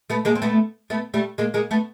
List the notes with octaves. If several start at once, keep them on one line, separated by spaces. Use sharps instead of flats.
A3 B3
G#3 A#3
C4
A3 B3
A3 B3
G3 A3
G#3 A#3
G#3 A#3
A3 B3